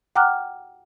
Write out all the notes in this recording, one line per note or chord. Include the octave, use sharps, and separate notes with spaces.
F#5 G5 A#5 D6 F6 F#6